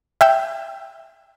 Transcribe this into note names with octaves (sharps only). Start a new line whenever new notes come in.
E5 G5 E6